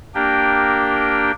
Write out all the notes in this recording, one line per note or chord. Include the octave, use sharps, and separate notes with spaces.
A#3 D4 G4 A#4 G5